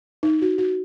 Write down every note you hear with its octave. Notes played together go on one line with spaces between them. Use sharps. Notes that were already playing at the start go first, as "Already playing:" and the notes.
D#4
F#4
F#4